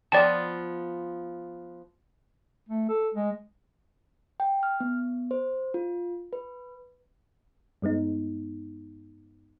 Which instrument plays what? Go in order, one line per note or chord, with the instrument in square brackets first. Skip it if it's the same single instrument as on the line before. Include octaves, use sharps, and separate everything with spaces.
[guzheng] F3 B3 F4 [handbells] D5 G5 A5
[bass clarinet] A3
A4
G#3
[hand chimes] G5
F6
B3
C5
F4
B4
[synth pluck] G2 G#3 B3 D#4